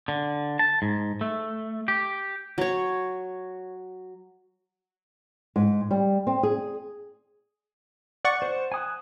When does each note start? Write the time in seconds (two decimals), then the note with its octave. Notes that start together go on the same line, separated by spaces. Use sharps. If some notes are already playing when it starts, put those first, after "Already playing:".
0.08 D3
0.59 A5
0.82 G#2
1.21 A3
1.88 G4
2.58 F#3 C#5
5.56 G#2
5.91 G3
6.27 C4
6.43 G#4
8.25 D5 F#5 C#6
8.42 C5
8.72 G#5 D#6 F#6